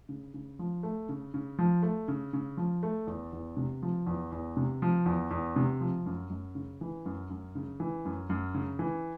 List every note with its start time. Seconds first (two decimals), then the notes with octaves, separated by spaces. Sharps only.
0.09 C#3
0.34 C#3
0.59 F3
0.83 A3
1.09 C#3
1.34 C#3
1.58 F3
1.83 A3
2.08 C#3
2.33 C#3
2.57 F3
2.83 A3
3.07 E2
3.33 E2
3.57 C3
3.82 F3
4.07 E2
4.32 E2
4.57 C3
4.82 F3
5.06 E2
5.31 E2
5.56 C3
5.81 F3
6.06 F#2
6.30 F#2
6.55 C#3
6.81 E3
7.06 F#2
7.30 F#2
7.55 C#3
7.80 E3
8.05 F#2
8.30 F#2
8.54 C#3
8.79 E3